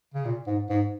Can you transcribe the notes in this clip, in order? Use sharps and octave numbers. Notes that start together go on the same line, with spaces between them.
C#3
A#2
G#2
G#2